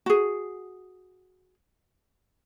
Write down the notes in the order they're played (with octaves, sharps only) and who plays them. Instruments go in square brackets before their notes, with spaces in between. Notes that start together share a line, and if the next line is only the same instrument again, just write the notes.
[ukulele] F#4 G#4